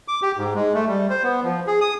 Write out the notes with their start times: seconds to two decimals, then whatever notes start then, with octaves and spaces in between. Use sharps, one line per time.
0.08 D6
0.22 G4
0.38 G#2
0.55 G#3
0.74 A3
0.88 G3
1.10 C5
1.23 B3
1.43 F3
1.67 G#4
1.81 D#6